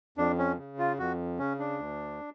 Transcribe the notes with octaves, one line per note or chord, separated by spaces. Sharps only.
F2 D4
C#4
C#3
F4
F2 F#4
C#3 C#4
D4
D2